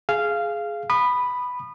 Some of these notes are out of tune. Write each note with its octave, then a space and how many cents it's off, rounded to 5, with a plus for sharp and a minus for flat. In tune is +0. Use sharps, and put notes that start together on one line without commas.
G#4 +10 F5 -15
B5 +0 D#6 -30